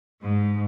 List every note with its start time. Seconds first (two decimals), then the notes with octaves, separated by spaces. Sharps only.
0.22 G#2